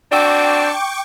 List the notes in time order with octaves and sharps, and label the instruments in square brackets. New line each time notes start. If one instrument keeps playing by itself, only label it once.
[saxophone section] C4 D4 F#4 [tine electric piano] D5 E6 [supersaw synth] G5 C#6 D6